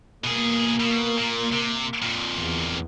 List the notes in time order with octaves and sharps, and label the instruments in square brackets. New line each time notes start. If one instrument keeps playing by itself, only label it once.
[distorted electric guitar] B2 G#4 [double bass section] A#3
[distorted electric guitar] B2
A#2
C3
F2 A#2
[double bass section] E2